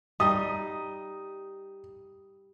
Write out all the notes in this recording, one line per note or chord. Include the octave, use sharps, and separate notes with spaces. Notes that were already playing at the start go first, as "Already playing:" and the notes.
G3 D#4 D#6